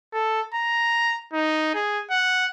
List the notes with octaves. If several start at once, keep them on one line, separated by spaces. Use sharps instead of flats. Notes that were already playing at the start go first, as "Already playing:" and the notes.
A4
A#5
D#4
G#4
F#5